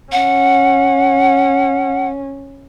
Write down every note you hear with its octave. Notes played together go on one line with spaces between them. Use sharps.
C#4 F#5